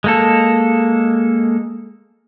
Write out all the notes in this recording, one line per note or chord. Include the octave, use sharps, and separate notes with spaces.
G#3 A#3 A4